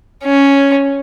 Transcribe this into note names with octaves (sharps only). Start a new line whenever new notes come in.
C#4